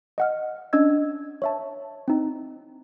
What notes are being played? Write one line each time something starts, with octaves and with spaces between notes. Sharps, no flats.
D#5 F#5 F6
C#4 D4 D#5 E6 G#6
C#5 E5 A5
C4 D#4